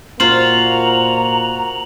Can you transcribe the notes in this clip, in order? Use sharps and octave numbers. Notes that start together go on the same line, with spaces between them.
A#2 A#3 F4 F#4 C5 A#5 F#7